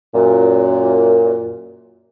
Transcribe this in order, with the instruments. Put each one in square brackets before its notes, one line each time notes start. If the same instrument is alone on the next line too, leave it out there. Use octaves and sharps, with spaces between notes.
[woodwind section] F#2 A#2